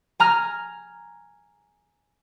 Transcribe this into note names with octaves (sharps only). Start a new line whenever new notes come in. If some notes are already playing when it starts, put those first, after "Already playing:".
G#5 A#5 F6